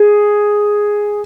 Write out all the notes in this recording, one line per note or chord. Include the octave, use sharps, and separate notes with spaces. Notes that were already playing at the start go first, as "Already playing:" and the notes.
Already playing: G#4